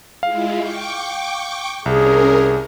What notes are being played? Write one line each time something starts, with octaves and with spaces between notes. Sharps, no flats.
G#3 E4 F4 F5
G5 C#6 D6
C2 C#4 G#4 A#4